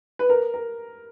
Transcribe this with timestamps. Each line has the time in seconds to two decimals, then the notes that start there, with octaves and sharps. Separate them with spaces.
0.19 B4
0.29 A#4
0.54 A#4